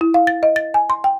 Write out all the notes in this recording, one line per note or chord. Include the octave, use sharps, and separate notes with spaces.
E4
F5
A6
D#5
A6
G#5
C6
G5